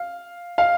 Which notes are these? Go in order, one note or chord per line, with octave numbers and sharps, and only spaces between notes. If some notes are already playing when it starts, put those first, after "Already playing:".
Already playing: F5
F5